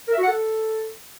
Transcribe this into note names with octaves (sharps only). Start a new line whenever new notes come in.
A#4
E5
F#4
F#5
A4